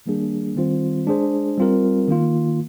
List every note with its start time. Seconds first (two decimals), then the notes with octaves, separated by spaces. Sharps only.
0.06 D#3 G3 A#3 D4 G#4
0.56 D#3 G3 C4 F4 C5
1.07 G#3 D4 G#4 C5
1.58 G3 C4 F4 A#4
2.08 D#3 A#3 F4